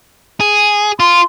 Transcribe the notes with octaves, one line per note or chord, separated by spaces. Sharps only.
G#4
F4 C6